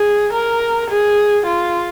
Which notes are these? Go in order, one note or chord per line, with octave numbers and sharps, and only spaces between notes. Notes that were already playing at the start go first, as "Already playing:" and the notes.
Already playing: G#4
A#4
G#4
F4